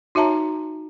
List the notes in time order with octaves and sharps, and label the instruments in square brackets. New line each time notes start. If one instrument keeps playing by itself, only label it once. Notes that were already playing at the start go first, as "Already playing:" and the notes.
[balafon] D#4 F#4 C#5 E5 A5 A#5